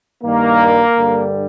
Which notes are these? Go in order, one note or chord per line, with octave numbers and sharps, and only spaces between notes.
G2 D#3 G3 A#3
G2 D3 G3